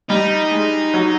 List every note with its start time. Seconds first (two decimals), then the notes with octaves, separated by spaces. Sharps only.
0.09 G3 D#4
0.51 G#3
0.94 F#3